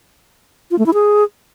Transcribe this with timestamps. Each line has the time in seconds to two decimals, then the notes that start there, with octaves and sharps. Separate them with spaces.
0.71 F4
0.79 A3
0.86 E4
0.94 G#4